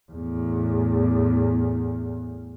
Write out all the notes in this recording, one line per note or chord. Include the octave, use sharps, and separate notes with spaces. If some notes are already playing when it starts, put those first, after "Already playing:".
E2 A2